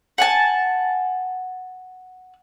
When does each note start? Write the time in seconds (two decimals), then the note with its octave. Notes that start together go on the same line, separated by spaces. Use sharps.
0.18 F#5 G#5 A5